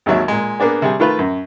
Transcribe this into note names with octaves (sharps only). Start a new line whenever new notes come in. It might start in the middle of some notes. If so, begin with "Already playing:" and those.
G#1 D#2 F#3 E5
A#2 G#3
A#3 B3 D4 G#4
C3 G3 G#4
D#3 A3 F4 B4
F#2